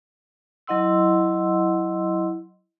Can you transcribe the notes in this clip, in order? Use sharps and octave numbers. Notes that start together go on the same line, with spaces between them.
F#3 E4 D#5 F#5 C6 E6